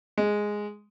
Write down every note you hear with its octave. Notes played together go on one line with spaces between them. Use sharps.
G#3